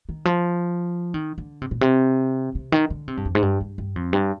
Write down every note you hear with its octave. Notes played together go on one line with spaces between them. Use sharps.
D#3
F3
D#3
D3
C3
A#2
C3
C3
D#3
D3
C3
G2
F2
G#2
G2
G2
G2
F2
G2